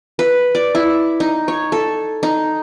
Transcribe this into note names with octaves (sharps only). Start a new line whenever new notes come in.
B4
D5
E4
D#4
C#5
A4
D#4